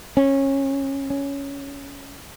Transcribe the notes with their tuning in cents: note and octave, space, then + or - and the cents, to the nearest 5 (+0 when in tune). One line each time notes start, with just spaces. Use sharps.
C#4 -20
C#4 +10